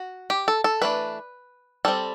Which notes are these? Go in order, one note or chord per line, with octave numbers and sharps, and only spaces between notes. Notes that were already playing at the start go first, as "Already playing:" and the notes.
Already playing: F#4
G4
A4
A4
E3 A3 D4 B4
G3 C4 A4